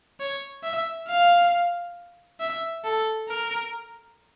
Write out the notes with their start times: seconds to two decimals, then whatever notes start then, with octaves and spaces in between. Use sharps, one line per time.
0.20 C#5
0.64 E5
1.08 F5
2.40 E5
2.84 A4
3.29 A#4